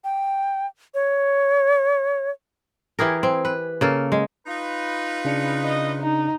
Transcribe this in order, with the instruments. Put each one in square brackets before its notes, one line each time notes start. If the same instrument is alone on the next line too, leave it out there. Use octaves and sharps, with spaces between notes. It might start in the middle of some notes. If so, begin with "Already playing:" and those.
[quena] G5
C#5
[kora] E3 G4 G#4 A#4
C4
B4
C#3 A#3 A4
G#3
[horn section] D#4 F4 B4
[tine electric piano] C#3 D4 C#7
[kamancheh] D#5
D#4